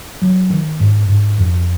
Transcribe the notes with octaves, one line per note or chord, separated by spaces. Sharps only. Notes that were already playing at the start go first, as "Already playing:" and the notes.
F#3
D#3
G#2
G#2
F2